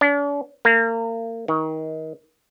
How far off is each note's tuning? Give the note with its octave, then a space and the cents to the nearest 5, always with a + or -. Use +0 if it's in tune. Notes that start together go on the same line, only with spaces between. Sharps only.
D4 -45
A#3 -35
D#3 +25